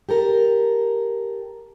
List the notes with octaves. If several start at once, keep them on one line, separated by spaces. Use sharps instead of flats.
G4 A4 A#4